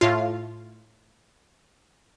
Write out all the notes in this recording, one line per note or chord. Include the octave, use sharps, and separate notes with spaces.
A2 F4